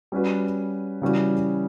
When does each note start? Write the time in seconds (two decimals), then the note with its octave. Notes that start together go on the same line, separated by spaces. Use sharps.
0.12 G3 C#4 F#4 B4
1.02 C#3 E3 G3 C#4 F#4